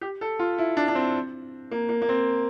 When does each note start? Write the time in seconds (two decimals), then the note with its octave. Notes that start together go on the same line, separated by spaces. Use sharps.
0.01 G4
0.21 A4
0.39 F4
0.58 E4
0.77 D4
0.88 D4
0.95 C4
1.71 A#3
1.89 A#3
2.02 A#3
2.09 C4